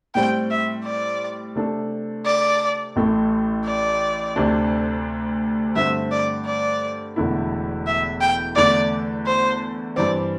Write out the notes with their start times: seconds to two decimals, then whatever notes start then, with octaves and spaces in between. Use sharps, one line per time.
0.15 A2 G3 C4 G5
0.50 E5
0.84 D5
1.56 C3 A3 D4 A4
2.25 D5
2.96 A1 A2 A3
3.65 D5
4.36 D2 C3 A3 D4
5.76 G2 D3 A3 C4 E5
6.11 D5
6.45 D5
7.16 E1 E2 D3 A3 E4
7.86 E5
8.21 G5
8.56 E2 D3 A3 D4 D5
9.26 C5
9.96 G2 E3 C4 D5